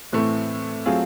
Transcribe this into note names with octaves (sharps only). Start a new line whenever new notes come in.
A2 E3 A3 C4
F#3 A3 C4 F4 G#4